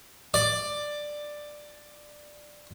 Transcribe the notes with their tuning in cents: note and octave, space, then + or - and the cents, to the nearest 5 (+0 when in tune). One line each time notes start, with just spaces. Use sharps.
D5 +10